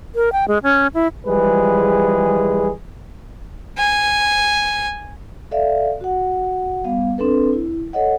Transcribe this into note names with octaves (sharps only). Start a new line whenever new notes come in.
A#4
G5
G#3
C#4
E4
E3 F3 G3 G#3 G#4 B4
G#5
A4 D5 E5 F5
F#4 F#5
G3 B3 F5
C4 D4 A4 B4
E4
A4 C#5 D#5 F#5